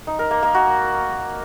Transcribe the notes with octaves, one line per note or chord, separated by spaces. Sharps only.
D#4
A#4
A#3
A#3
F#4